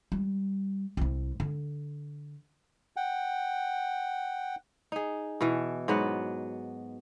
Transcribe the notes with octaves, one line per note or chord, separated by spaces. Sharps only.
G3
C2 E4
D3
F#5 G5
D#4 G#4
B2 E3
G#2 F#3 B3 F#5